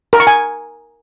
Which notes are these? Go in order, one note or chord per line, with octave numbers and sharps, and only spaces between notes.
A#4
C#6
G#5